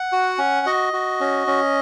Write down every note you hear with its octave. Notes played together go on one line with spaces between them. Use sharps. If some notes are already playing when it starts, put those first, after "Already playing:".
Already playing: F#5
F#4
C#4
F#4 D#5
F#4
C#4
C#4